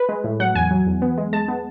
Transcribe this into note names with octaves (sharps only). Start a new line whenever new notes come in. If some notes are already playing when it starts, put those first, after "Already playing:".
Already playing: B4
G#3
A2
F#3 F#5
E2 G#5
F#3
E2
B3
G#3
G#3 A5
B3